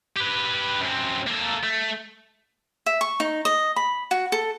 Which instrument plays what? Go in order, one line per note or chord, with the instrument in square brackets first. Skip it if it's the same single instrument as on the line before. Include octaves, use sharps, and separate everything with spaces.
[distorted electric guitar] G4 B4
F#2 C4
A#3 A4
A3
[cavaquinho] E5
C#6
D#4
D#5
B5
F#4
A4